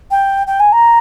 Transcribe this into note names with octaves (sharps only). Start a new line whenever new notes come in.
G5
G5
G#5
A#5